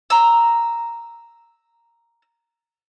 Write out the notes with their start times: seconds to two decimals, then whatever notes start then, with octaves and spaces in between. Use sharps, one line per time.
0.10 A#5 E6